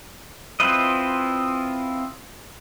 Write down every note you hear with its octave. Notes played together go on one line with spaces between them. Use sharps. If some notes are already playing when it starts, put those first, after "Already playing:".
C4 E4 F4 B4 D#5